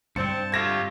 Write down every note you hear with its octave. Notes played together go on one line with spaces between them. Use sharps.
C#2 G2 C4 A5 C#7
D3 A3 C4 F4 G4 G#6 A#6 E7